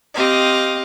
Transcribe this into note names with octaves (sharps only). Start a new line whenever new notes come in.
C4 G4 D#5 F5